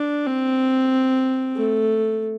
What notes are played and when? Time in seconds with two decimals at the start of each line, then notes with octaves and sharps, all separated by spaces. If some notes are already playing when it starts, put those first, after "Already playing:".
Already playing: D4
0.26 C4
1.56 A3